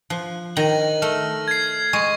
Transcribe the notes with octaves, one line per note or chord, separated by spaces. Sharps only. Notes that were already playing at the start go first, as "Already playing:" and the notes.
F3 F#6
D#3 A#6 D#7 F#7
A3 F6
G#6 C7
G#3 C#6